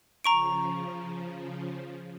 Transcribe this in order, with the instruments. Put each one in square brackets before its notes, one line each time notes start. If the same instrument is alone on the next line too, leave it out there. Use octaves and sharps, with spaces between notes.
[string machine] C#3 F3 [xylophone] A#5 C#6 D7